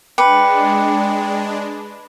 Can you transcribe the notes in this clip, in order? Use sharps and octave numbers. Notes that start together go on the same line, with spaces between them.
G#3 D4 B4 G5 D6 C#7